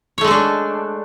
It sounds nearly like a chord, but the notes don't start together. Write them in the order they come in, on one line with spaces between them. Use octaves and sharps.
C#5 A3 G#3 A4 D4